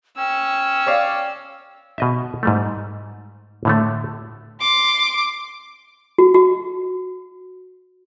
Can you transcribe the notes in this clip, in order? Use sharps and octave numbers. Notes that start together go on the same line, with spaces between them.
C#4 G5 E6
C#5 D5 F5
B2 D#5 E5
G#2 G3 A3
A2 D3 A3
C6 D6
F#4
F#4